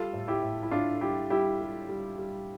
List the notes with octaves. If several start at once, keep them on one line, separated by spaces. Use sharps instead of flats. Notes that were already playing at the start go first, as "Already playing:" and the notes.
Already playing: G3 F4 A4
A2
E4 G4
A2
E4
A2 D4 F4
G3 E4 G4
G3 E4 G4
G3
G3
G3